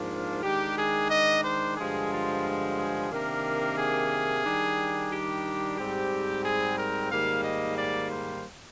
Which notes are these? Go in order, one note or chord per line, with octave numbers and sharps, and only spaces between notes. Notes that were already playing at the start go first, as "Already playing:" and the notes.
Already playing: G#2 F3 A#3 D4 F4
D#3 G#3 D4 G4
G#4
D#5
C5
G2 D3 F3 G#3 G#4
F4
G#4
C3 D#3 A#3 D4 A#4
G#4
D#3 G3 D4
G4
G#2 G3 C4 G4
G#4
A#4
G#2 D#3 G3 A#3 F5
D#5
D5
C5